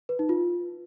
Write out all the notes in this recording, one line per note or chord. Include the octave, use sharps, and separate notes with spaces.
B4
D#4
F4